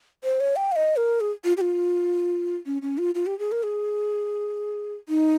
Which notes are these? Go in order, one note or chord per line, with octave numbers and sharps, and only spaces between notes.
C5
C#5
G5
F5
D#5
A#4
G#4
F4
G4
F4
C#4
C#4
F4
F4
G4
G#4
A#4
G#4
D#4